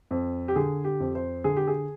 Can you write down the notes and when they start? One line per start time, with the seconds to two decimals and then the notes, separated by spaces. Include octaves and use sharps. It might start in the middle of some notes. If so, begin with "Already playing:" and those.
0.11 F2
0.48 G4
0.56 D3 G#4
0.84 G4
1.00 F2
1.15 C5
1.44 D3 G#4
1.57 G4
1.67 G#4